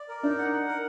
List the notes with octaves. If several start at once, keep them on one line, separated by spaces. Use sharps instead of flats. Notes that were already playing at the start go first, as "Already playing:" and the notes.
Already playing: D5
A#4
D4 D#4
F#5
F#5
A#4